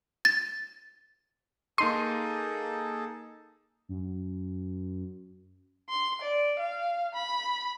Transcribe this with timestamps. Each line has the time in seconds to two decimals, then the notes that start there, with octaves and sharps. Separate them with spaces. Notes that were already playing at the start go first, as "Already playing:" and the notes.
0.25 A6
1.78 A#3 D#4 G#4 A4 A5 C6 D#7
3.89 F#2
5.90 C6
6.22 D5
6.59 F5
7.15 B5